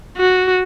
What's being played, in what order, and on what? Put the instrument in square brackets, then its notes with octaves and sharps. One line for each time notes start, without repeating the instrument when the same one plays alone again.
[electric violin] F#4